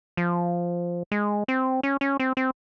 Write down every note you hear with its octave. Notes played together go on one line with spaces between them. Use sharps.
F3
G#3
C4
C#4
C#4
C4
C4